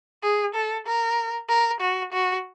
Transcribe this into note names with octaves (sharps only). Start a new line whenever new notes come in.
G#4
A4
A#4
A#4
F#4
F#4